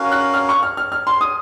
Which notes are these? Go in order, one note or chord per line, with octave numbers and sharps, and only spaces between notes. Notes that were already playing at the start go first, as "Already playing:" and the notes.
Already playing: C#4 F#4 A#4 F5
F#6
F6
C#6
F6
F6
F6
C6
D#6